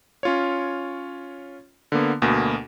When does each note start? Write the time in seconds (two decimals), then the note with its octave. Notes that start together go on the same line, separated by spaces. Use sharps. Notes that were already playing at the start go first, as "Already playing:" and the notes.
0.23 C#4 F4 C#5
1.92 D3 A#3 B3
2.22 D2 B2 A#3